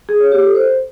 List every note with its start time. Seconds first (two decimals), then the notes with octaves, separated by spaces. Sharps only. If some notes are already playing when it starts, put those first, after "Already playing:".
0.09 G#4
0.20 C#5
0.32 G4
0.43 A4
0.55 C5